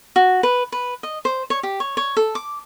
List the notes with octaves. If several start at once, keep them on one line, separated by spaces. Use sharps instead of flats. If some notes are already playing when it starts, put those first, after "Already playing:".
F#4
B4
B4
D#5
C5
C#5
G4
C#5
C#5
A4
D6